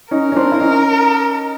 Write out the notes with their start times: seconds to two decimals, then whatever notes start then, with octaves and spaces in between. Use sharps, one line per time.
0.11 C#4 D#4 A#4
0.32 C#4
0.36 C4 D4
0.52 E4
0.60 C#4 D#4